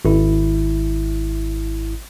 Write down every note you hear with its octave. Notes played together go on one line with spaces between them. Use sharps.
G#1 E4